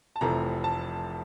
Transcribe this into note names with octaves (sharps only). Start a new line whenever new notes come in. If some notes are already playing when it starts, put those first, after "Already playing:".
A5
F1 F2 C3 E3 A3 A#5
A5